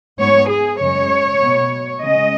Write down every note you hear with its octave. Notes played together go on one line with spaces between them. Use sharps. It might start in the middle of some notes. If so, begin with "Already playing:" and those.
G#2 G#3 B3 C#5
G#4
F#2 C#3 G#3 C#5
B2 B3
C#3 G#3 C#4 D#5